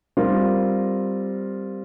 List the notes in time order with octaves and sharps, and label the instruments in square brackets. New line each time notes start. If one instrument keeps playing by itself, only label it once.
[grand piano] G3 C4 F4 A#4